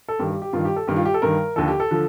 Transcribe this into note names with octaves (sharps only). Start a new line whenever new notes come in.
A4
G2 D#3 G4
G4
G4
G2 D#3 F4
G4
A4
G2 D#3 G4
F4
G4
A4
G2 D#3 A#4
D#2 D3 F3 A4
G4
A4
D3 F3